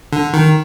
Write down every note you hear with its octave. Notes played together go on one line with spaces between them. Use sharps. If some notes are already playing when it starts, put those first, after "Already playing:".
D3
D#3